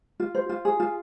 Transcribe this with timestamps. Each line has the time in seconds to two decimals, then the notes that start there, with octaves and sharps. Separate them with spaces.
0.20 F4
0.35 C5
0.49 F4
0.65 G#4
0.80 F4